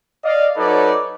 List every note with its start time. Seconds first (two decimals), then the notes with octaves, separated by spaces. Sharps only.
0.25 D5 D#5 F5
0.58 F#3 D#4 A4 B4 C#5 D5